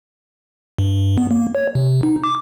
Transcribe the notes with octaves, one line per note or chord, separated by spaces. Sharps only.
G2
B3
A#3
C#5
C3
D#4
D6